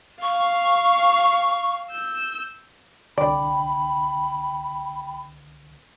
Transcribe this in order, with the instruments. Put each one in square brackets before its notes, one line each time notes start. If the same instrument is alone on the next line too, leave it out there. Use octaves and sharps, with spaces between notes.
[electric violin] F5 [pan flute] C#6
[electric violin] E6 G6
[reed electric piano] C2 D3 [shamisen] D5 [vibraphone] G5 [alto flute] B5